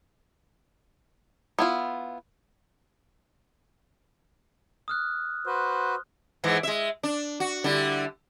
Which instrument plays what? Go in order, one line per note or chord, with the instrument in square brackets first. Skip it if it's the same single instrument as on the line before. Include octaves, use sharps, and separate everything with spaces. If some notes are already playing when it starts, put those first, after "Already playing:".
[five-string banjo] B3 E4 F4
[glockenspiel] D#6 F6 F#6
[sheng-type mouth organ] F#4 B4 [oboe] C5
[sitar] G#2 E3 G#3
G#3 E5
D4
F#4
D3 G3 E4